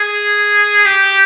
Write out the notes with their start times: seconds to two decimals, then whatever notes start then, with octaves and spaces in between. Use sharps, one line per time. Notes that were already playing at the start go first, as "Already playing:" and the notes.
Already playing: G#4
0.85 G4